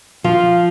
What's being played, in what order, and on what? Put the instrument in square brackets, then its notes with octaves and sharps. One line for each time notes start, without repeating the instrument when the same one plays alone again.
[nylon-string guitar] F3 [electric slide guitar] F4